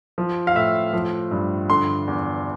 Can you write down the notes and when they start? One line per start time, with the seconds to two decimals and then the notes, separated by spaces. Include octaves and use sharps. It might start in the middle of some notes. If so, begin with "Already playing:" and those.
0.18 F3
0.47 F5
0.55 A2 E5
0.93 F3
1.31 G2
1.69 D3 C6
2.08 E2